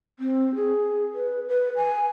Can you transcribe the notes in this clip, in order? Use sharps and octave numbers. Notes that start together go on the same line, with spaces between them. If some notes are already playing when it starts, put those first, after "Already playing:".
C4
G#4
B4
B4
G#5